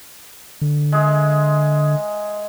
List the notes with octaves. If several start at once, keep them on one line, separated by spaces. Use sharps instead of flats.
D3
G#3 G#4 E5